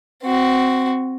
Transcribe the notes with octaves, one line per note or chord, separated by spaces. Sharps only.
C4 F#4